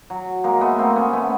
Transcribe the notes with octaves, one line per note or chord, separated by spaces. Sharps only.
F#3
G#3 A#3
A3 B3
A#3 C4
B3 C#4
A3 B3